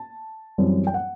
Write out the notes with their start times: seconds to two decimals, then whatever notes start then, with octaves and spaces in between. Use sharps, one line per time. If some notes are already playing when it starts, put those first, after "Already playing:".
Already playing: A5
0.58 F#2 E3 G3 C4
0.87 G5
0.94 F#5